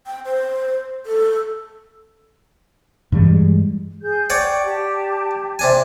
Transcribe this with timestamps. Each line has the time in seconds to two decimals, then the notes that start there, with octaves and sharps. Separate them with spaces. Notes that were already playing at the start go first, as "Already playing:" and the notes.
0.06 G5
0.25 C5
1.06 A4
3.12 G2 E3 G3 G#3
4.02 G#4 G6
4.30 C#5 D5 F#5 G5
4.64 G4 A5
5.59 C3 D4 G#5